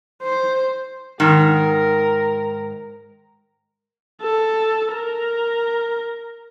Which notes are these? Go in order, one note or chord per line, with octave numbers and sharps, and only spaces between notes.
C5
G#2 D#3 A#4
A4
A#4